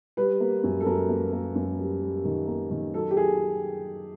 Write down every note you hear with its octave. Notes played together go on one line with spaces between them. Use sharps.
G3 B4
A#3
F#2
A4
F#2 A#4
A#3
A#3
F#2
G3
G3
D#3
A#3
D#3
F#3 A4
G4
F#3 G#4